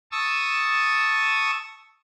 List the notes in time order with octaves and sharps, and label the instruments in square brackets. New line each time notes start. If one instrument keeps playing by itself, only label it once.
[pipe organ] A5 C#6 D#6 E6